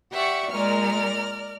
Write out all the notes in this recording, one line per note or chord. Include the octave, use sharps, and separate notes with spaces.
G4 D5 E5 F#5 C#6
A#2 G#3 A#4 D5 F6